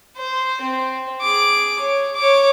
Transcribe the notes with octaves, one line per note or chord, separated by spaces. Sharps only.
C5
C4
G#4 D6
C#5
C#5 D6